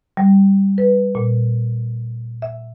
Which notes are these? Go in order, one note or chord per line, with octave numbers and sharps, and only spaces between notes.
G3
B4
A#2
E5